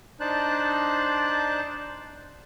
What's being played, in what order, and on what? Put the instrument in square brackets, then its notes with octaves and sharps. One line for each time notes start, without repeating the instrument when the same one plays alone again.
[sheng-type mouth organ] D4 D#4 C5 D5 A5 F#6